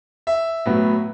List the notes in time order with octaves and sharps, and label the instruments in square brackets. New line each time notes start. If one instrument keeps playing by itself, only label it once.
[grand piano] E5
A2 F#3 B3